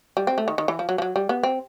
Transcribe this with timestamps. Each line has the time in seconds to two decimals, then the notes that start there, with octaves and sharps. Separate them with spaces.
0.17 G3
0.27 C4
0.38 A3
0.48 D#3
0.58 D#3
0.68 E3
0.79 F3
0.89 F#3
0.98 F3
1.02 F#3
1.16 G3
1.29 B3
1.43 C4